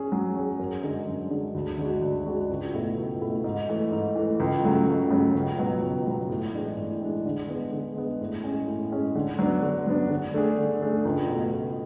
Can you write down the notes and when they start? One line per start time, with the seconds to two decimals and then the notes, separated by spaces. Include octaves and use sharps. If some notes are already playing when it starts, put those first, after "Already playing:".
Already playing: C#4 G#4
0.12 F#3
0.36 C#4 G#4
0.60 F#2
0.83 D3 G#3
1.07 F#2
1.31 D3 G#3
1.55 D2
1.79 D3 G#3 D4 F#4
2.02 D2
2.26 D3 G#3 D4 F#4
2.49 C#2
2.74 B2 A3 E4
2.98 C#2
3.20 B2 A3 E4
3.44 G#2
3.69 E3 A3
3.92 G#2
4.15 E3 A3
4.40 C#2
4.64 C#3 F#3 A3
4.87 C#2
5.10 C#3 F#3 A3
5.35 C#2
5.58 B2 F#3 B3
5.82 C#2
6.07 B2 F#3 B3
6.29 A2
6.54 E3 G#3 D4
6.77 A2
7.02 E3 G#3 D4
7.25 D3
7.48 G#3 B3
7.72 D3
7.96 G#3 B3
8.21 A2
8.44 G#3 C#4 G#4
8.68 A2
8.92 G#3 C#4 G#4
9.15 D3
9.39 F#3 B3 D4
9.62 D3
9.86 F#3 B3 D4
10.10 D3
10.34 A3 D4 G#4
10.58 D3
10.82 A3 D4 G#4
11.05 C#2
11.29 B2 A3
11.52 C#2